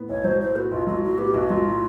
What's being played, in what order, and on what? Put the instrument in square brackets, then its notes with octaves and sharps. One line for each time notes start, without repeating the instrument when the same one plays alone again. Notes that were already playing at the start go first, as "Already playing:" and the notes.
Already playing: [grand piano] A2 B3
[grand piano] B1 [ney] C#5
[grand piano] F#3 [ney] C5
[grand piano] A2 [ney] C5
[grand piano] B3 [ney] F#4
[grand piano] B1 [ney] F4
[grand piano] F#3 [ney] F4
[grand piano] A2 [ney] F#4
[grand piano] B3 [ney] G4
[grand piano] B1 [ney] F#4
[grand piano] F#3 [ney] F4
[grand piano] A2